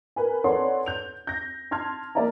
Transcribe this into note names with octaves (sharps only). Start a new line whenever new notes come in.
A#4 B4 G#5
A4 B4 C#5 D5 F#5 C6
G6 F7
G6 A#6
A5 C6 F6 G#6
A#3 D5 E5 A5 A#5